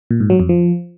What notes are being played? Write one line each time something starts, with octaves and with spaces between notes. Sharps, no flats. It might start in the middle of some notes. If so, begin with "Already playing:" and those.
A#2
G#2
F#3
F2
F3